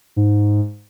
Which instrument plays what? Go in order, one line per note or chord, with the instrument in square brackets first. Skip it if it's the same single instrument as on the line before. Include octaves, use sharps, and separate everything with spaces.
[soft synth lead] G#2